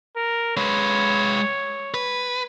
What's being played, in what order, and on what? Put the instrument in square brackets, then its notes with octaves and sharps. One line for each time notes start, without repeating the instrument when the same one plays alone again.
[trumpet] A#4
[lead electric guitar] G#3 B4 [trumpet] C#5
[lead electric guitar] B4